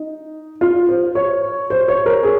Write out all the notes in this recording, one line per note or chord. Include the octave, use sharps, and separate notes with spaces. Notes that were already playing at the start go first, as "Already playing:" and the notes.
Already playing: D#4
F4
C5
C#5
C5
C#5
A#4
G#4